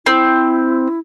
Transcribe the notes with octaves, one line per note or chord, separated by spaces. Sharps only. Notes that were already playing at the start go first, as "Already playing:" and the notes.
C4 E4